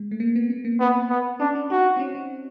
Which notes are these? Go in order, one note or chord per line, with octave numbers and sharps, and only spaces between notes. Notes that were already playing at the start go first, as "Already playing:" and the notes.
Already playing: G#3
A3
A#3
B3
B3
A#3
B3 C4
B3
C#4 D4
D4
D#4 F#4
C4
C#4
C4